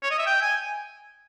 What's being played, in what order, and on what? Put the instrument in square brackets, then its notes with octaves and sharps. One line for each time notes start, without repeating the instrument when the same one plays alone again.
[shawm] C#5
D#5
E5
G5
G#5